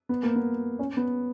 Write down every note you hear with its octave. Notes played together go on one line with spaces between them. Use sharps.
B3
A#3
B3
C#4
B3